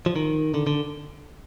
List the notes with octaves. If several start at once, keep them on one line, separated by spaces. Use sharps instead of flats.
F3
D#3
D3
D3